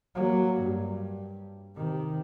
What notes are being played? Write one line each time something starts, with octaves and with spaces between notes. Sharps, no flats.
F#3 A#3
G2
C3 D#3